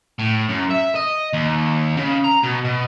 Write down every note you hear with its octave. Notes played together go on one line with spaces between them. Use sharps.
A2
F#2
E5
D#5
D#2
C#3
A#5
B2
B2